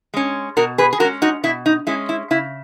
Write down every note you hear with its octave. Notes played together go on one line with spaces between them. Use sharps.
G#3 C#4
B2 F#4 A#4
G#4 B4
G#4
G#3 C#4 F#4 A#4
D#4 F#4
B2 E4
D#4
G#3 C#4 E4
E4
C#3 E4